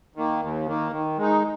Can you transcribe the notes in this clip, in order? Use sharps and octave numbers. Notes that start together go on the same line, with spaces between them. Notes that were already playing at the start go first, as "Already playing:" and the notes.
D#3 A#3
D#2
D#3 A#3
D#3
G#3 D#4